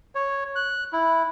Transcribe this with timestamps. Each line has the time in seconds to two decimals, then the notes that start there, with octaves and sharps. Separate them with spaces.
0.15 C#5
0.56 F#6
0.93 E4